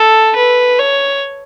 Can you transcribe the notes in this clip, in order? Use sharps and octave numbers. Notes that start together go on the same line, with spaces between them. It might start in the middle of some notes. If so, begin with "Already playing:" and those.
Already playing: A4
B4
C#5